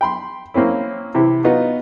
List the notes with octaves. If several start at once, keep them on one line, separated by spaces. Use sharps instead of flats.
G5 B5 C6
A#3 C4 C#4 E4
C3 E3 E4 G4
B3 D#4 F4 F#4